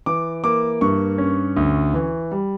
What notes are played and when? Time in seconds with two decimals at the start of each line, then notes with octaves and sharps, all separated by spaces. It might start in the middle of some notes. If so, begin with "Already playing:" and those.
0.06 E3 D6
0.44 A#3 D6
0.81 G2 C#6
1.18 C#4
1.57 D2
1.94 E3
2.31 G3